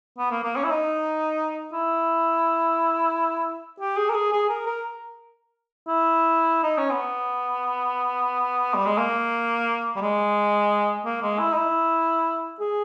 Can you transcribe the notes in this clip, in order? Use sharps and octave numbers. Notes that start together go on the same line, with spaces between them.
B3
A#3
A#3
C#4
E4
D#4
E4
G4
G#4
A#4
G#4
G#4
A#4
A#4
E4
D#4
C#4
B3
G3
G#3
A#3
G3
G#3
A#3
G#3
E4
D#4
E4
G#4